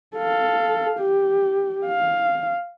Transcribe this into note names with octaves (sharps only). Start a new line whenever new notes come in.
A4 F5
G4
F5